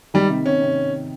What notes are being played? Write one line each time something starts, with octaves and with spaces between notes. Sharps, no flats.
D#3 G3
C3
C3 C#4
C3